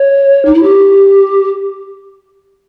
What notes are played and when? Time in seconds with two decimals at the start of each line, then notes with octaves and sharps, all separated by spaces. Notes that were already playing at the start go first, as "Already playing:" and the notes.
Already playing: C#5
0.45 D#4
0.54 E4
0.63 G4